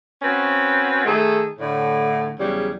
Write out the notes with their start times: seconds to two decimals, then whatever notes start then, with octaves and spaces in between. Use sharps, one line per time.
0.22 C4 C#4 F#4 B4
1.05 D#3 A3 G#4 A4
1.59 A2 D3
2.39 E2 C#3 F#3 G3